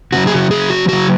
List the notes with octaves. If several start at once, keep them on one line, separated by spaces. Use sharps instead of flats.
C#3 F#3 F#4
G#4
F#4
G#4
F#4
C#3 F#3 F#4